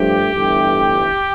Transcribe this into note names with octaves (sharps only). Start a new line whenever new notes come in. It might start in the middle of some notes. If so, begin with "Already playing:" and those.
Already playing: G2 F3 A3 G4
G1 G2 E3 A3